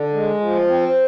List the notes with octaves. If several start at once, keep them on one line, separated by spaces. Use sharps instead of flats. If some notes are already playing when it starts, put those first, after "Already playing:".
Already playing: D3
G#3
F3
C4